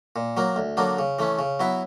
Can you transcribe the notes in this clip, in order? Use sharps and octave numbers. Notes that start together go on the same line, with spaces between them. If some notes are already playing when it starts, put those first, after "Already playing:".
A#2
F#3 A#3
D2
D3 F#3 A#3 D4
C#3
E3 A3 C#4
C#3
F#3 B3 E4